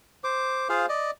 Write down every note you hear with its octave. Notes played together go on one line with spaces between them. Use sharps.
C5 D6
F4 G#4 C5 F5
D5 D#5